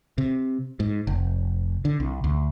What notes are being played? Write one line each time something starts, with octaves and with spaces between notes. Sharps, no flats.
C3
G#2
F1
D3
C2
D2